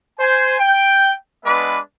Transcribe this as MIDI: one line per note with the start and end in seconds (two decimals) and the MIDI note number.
0.20 0.55 72
0.20 0.55 80
0.60 1.13 79
1.45 1.78 56
1.45 1.78 59
1.45 1.78 62
1.45 1.78 71
1.45 1.78 76
1.45 1.78 86